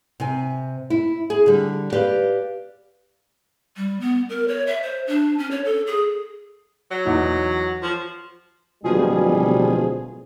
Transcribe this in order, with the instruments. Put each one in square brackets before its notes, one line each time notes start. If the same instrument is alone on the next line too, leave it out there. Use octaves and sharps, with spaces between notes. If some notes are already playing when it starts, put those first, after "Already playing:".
[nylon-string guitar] C3 G#5
E4
G#4
D3 G3
G4 B4 D5 F5
[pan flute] G3
B3
A#4
C#5
E5
C5
D4
C#4
C#5
A4
G#4
[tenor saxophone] F#3
[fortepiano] E2 D#4
[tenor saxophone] F3
[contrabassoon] D1 [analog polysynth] B2 F3 G#4 [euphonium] G3